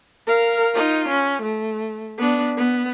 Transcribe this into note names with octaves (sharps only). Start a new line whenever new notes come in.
A#4 F5
D#4 F4
C#4
A3
B3 D4
B3